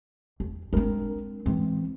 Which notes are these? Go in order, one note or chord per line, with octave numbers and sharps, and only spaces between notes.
E2
G#3 C4 D4 A#4
E3 G#3 C4 C#4